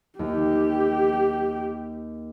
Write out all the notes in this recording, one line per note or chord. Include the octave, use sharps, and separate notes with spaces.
D#2 G4